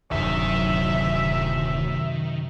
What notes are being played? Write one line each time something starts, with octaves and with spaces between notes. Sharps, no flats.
D1 F#2 C3 D#3 E5